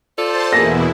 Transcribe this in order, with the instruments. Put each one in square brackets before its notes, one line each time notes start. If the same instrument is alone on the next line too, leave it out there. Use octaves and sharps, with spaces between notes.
[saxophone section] F4 A4 D5 [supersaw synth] C5 A5
[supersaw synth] E2 B2 E4 [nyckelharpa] A#3 G#4 [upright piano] A#6